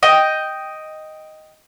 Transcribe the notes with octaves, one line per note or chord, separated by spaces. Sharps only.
D#5 G5